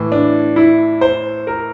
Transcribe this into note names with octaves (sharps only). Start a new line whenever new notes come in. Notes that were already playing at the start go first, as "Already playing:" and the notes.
Already playing: A2 E3
D4
E4
C5
A#4